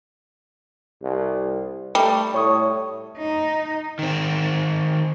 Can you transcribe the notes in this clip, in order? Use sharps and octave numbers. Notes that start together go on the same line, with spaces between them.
C2
G3 A3 G5
A2 C#5 C#6 D#6
D#4
D#3 C4